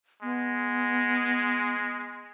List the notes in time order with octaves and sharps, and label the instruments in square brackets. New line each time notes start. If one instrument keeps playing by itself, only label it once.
[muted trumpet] G#3 [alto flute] B3